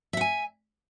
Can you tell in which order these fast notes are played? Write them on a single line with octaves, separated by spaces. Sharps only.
E5 F#5 G#5